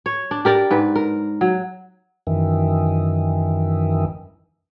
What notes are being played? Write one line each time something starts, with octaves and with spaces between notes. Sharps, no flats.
C#5
D4
G4 A#4 D5
G#2 B4
A#4
F#3
F#2 D#3 E3